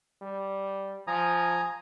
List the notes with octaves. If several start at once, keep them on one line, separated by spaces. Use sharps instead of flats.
G3
F3 G#5 A#5 D#6